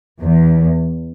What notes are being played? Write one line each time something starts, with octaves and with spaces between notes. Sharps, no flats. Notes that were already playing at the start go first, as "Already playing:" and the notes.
E2